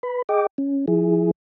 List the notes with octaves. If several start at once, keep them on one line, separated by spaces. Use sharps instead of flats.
B4 B5
G#4 D#5 G5 D6
C#4
F3 E4 G#4